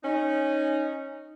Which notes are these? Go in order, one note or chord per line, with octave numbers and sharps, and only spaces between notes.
C#4 D#4